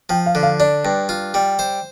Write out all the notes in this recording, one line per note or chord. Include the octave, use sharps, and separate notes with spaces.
F3 G5
F5
D3
F5
D4 D5
G2
F4
G3
C5